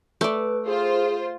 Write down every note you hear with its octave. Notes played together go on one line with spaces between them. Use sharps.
A3 B4 D5
F4 G#4 C5